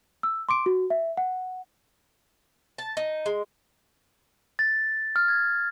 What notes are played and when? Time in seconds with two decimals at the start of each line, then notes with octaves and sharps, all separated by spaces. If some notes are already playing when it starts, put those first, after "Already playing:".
0.23 E6
0.49 C6 D6 D7
0.66 F#4
0.90 E5
1.17 F#5
2.78 A5
2.97 D#4
3.26 G#3
4.59 A6
5.16 F6
5.28 G#6